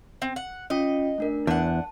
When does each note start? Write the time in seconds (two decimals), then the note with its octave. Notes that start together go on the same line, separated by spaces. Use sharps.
0.22 C4
0.36 F#5
0.70 C#4 F4 D#5 G5
1.18 A3 D4 A#4
1.47 E2 D4 F#5 A5